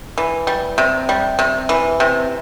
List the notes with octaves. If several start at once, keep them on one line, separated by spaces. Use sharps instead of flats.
E3
G3
C3
G3
C3
E3
C3